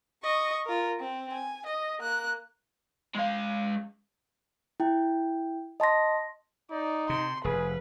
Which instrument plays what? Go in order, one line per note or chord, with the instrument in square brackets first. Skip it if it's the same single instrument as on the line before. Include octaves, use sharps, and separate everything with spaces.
[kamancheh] D#5 C#6
F4 A#4
C4
G#5
D#5
A#3 F#6
[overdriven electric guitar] G#3 F5
[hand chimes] E4 G5
D#5 A5 C6 A#6
[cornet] D#4 [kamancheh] D5
[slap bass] C3 [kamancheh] C6
[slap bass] F1 [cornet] G#4 [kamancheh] B4